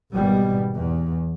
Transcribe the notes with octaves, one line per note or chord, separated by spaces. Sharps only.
G#1 B2 G3
E2